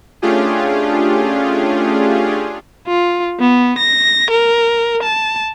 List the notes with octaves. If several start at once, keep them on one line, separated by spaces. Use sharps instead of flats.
A3 C#4 D4 F4 G4 G#4
F4
B3
A#6
A#4
A5